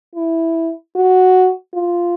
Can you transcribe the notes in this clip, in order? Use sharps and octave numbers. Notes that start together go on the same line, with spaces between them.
E4
F#4
F4